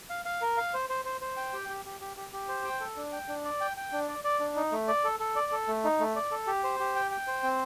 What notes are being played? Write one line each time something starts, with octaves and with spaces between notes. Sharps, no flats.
F5
F5
A#4
F5
C5
C5
C5
C5
G5
G4
G4
G4
G4
G4
G4
C5
G5
A4
D4
G5
D4
D5
G5
G5
D4
D5
D5
D4
D#4
A3
D5
A4
A4
D5
A4
A3
D#4
A3
D5
A4
G4
C5
G4
G5
G5
C5
C4